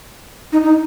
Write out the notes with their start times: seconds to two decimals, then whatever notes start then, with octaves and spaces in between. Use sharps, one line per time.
0.52 D#4
0.63 D#4